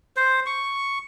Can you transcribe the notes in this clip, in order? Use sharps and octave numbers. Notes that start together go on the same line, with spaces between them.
C5
C#6